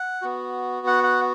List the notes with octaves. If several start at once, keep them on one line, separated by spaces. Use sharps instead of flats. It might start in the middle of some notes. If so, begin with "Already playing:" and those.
Already playing: F#5
B3 F#4
F#5
F#5